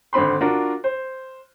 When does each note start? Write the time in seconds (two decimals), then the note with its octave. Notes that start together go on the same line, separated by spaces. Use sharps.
0.13 G#1 D3 C4 B5 C6
0.41 D4 F4 F#4 A#4
0.84 C5